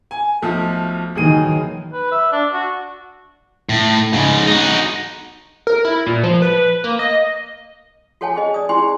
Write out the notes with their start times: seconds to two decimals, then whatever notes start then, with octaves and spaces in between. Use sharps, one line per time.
0.11 G#5
0.42 B1 F3 A3
1.15 D#2 D#3 E3 F#3 G#4 D#7
1.93 B4
2.12 E5
2.32 D4
2.53 F#4
3.69 A2
4.13 G#2 C#3
4.47 D#4 F#4
5.67 A#4
5.85 E4
6.06 A#2
6.23 F3
6.42 B4
6.84 A#3
6.99 D#5
8.21 F#4 A4 C#5 F#5 G#5 A5
8.36 G#4 C5 D#5
8.54 D5 D#6
8.69 E4 G4 G#4 C5 G#5 C6